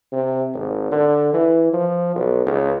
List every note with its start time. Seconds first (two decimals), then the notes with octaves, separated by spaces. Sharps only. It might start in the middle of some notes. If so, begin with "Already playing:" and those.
0.12 C3
0.55 G#1
0.92 D3
1.34 E3
1.73 F3
2.16 B1
2.46 C#2